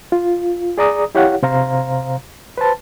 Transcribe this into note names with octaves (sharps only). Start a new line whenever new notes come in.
F4
G#4 D5 A#5 D#6
E4 G4 C#5 F5 F#5
C3 C5 F5 A#5
B4 C5 A5